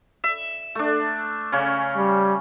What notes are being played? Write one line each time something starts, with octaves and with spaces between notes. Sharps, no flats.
E5
A3 D4
C#3 C#4
G3